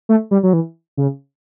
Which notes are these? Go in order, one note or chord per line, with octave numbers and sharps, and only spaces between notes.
A3
G3
F#3
E3
C#3